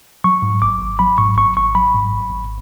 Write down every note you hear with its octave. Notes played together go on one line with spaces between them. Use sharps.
F#3 C#6
G#2
G#1 D6
G#1
F#3 B5
G#2 C#6
G#1 C#6
G#1 C#6
F#3 B5
G#2
G#1
G#1